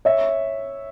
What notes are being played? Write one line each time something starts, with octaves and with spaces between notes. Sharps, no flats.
C#5 E5